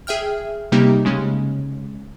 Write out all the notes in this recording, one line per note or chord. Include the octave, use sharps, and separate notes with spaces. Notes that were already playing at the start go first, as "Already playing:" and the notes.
G#4 E5 G5 F6
C3 G3 A#3 D#4 G4
C#3 G#3 C#4